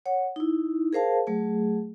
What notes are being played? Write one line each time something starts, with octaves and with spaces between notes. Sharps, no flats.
C#5 F#5
D#4 E4
G#4 A#4 C5 F5 A5
F#3 A3 G#4